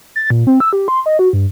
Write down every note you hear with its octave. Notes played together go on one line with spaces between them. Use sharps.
A6
A#2
C4
E6
G4
C6
D#5
F#4
G2